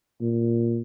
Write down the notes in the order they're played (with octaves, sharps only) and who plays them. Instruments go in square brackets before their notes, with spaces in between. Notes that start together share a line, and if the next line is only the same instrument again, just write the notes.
[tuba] A#2